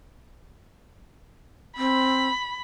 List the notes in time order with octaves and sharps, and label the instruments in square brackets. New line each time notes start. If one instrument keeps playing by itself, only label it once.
[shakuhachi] C4 [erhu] B5